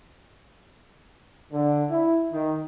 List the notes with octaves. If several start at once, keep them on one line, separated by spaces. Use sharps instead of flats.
D3
E4
D#3